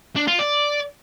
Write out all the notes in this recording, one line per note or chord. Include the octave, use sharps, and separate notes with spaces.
D4
F4
D5